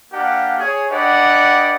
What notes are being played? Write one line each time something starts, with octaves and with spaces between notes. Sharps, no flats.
A#3 D4 G4 F5 F#5
G#4 C#5
D4 G4 B4 D5 D#5 F#5